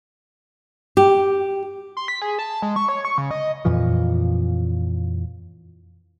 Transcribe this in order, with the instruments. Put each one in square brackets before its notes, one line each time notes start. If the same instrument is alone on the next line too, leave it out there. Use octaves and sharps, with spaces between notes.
[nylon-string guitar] G4
[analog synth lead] C6
B6
G#4
A5
G#3
C#6
C#5
C#6
C#3
D#5
[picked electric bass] F2 A#2 E3 F3